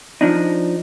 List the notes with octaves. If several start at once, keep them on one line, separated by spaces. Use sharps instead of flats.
F3 D4 D#4